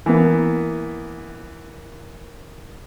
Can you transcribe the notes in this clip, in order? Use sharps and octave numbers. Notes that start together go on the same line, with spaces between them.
E3 A#3 B3